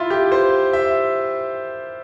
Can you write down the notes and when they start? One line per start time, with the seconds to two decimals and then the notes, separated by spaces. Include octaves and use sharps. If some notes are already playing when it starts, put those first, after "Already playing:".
Already playing: E4 F4
0.10 G4
0.32 C5
0.73 E5